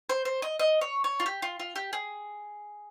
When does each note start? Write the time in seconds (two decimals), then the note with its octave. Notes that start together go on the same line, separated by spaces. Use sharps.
0.09 C5
0.25 C5
0.42 D#5
0.59 D#5
0.81 C#5
1.04 C#5
1.20 F4
1.26 G4
1.42 F4
1.59 F4
1.75 G4
1.93 G#4